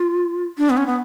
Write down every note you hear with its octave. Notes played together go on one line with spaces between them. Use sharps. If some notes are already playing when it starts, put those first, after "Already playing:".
Already playing: F4
D4
B3
C#4
B3